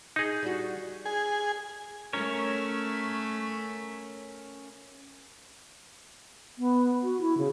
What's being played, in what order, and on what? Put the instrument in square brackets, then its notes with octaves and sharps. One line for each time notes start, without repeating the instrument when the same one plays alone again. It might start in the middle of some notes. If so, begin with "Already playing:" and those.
[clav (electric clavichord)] D#4 G#4
[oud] G3 F#4
[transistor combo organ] G#4
[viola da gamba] A3 [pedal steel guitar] C#4 A#4 C#5
[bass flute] B3
F#4
E4
C#3